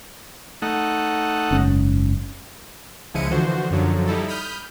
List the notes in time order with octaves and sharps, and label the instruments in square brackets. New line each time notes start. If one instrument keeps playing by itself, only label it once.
[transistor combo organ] A3 D#4 F#5
[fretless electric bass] F#1 G#2 C#4
[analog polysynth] C#2 F3 G#3 E4 C#7 D#7
D3 E3 F3 F#4 C5
F#2 D3 F3 F#3
G3 D#4 E4 A4
B5 D#6 F6 G6